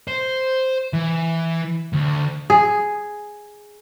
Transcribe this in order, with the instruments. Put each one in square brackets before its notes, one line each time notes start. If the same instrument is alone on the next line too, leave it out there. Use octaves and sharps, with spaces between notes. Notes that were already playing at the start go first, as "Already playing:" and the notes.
[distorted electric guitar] C5
E3
D2
[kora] G#4